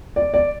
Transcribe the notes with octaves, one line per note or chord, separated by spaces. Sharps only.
D5
D5